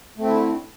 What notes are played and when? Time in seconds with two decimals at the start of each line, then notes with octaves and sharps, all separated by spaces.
0.18 A3
0.21 C4
0.25 E4
0.28 D3